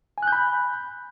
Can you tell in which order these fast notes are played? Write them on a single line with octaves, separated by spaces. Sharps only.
G#5 F#6 G6 B5